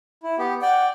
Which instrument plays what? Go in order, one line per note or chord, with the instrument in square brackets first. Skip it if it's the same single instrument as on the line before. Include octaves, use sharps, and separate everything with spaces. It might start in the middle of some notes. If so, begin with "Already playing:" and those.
[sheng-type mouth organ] E4
B3 G4
[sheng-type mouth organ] D5 G5 [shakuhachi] F#5